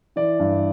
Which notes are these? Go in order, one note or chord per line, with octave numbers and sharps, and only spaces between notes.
E3 D5
G2